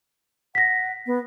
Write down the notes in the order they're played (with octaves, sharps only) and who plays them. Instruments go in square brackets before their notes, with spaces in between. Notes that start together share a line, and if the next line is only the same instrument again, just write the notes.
[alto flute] F#5 [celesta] A#6 B6
[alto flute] B3